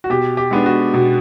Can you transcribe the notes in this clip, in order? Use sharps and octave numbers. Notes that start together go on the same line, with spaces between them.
F#4
B2 G4
G4
G#3 B3 D4
F#4
B2